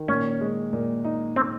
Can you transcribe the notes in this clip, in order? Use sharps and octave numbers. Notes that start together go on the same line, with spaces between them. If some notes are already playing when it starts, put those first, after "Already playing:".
Already playing: D#3
A#2 C#4
G#3
A#2
D#4
C4